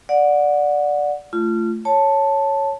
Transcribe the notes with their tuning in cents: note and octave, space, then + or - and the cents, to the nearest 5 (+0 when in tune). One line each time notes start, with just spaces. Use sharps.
D5 +0 F#5 -20
A3 +0 F4 -25
C#5 +0 A5 +0